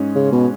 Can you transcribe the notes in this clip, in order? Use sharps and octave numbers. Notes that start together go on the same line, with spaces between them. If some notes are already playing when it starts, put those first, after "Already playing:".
Already playing: G#2 G#3 C#4
C#3
B2